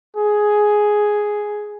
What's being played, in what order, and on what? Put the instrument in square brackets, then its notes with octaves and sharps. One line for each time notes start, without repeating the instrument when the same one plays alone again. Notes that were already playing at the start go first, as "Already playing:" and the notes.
[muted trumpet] G#4